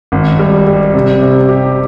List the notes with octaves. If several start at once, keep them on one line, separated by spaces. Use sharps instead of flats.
G#1
G3
G3
C3
C3
G4